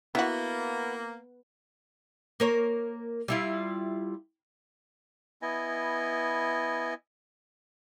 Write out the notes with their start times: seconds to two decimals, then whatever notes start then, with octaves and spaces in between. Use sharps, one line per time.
0.15 A#3 B3 E4 F#4
2.40 A#3 A#4 C#5
3.28 G3 E4 F4
5.42 B3 E4 D#5 G#5